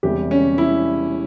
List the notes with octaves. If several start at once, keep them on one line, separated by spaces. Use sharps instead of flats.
E1 E2 C3 G3 G4
C#4
E4